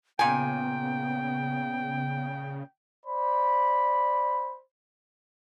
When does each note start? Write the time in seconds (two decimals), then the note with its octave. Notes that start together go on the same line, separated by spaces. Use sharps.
0.19 A#2 C#3 B3 G5 G#5
3.06 C5 D5 B5